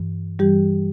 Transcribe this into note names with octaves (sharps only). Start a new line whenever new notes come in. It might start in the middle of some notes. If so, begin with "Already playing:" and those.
Already playing: G2 E3
G2 E3 G3 G4